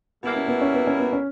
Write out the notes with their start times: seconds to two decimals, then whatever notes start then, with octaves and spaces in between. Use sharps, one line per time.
0.23 B2 G3 A#3 B3 E4
0.36 C#4
0.48 B3
0.61 C#4
0.74 B3
0.87 C#4
1.00 B3
1.13 C#4